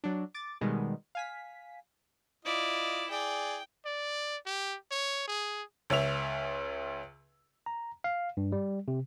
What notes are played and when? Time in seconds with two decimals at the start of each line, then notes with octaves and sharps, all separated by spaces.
0.04 F#3 D4
0.34 D6 A6
0.61 B2 D#3 G3 G#3 B3
1.15 F5 G#5 B6
2.45 E4 F4 D5 D#5
3.11 G#4 D5 G5
3.85 D5
4.46 G4
4.91 C#5
5.28 G#4
5.90 C#2 C#4 E5 F7
7.66 A#5
8.04 F5
8.37 G2
8.52 G3
8.88 C3